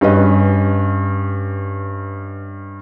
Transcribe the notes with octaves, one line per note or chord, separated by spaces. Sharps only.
G2 C#4 B4 D#5